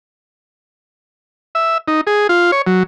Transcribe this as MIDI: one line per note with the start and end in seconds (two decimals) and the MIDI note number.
1.55 1.78 76
1.88 2.01 63
2.07 2.27 68
2.29 2.51 65
2.52 2.62 73
2.67 2.83 54